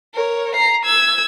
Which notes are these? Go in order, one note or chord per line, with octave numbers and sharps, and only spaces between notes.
A#4 C#5
A#5 C7
E6 G#6